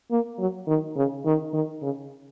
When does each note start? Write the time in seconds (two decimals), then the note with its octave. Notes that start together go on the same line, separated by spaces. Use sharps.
0.11 A#3
0.39 F#3
0.67 D#3
0.96 C#3
1.25 D#3
1.53 D#3
1.82 C#3